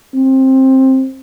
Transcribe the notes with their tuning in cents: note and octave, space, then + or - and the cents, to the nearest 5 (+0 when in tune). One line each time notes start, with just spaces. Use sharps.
C4 +15